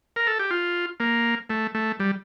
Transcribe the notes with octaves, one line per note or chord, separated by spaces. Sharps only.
A#4
A4
G4
F4
A#3
A3
A3
G3